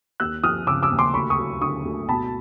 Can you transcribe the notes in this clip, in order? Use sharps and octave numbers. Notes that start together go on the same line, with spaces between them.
D#2 E6 F#6
F3 D#6 F6
C#3 D6 E6
D6 E6
D#2
C6 D6
D2 B5 C#6
C#6 D#6
F#3
D3 C#6 D#6
D2
B2 A5 B5